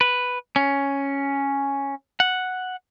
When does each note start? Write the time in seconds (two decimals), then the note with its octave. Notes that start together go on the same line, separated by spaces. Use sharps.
0.01 B4
0.56 C#4
2.20 F#5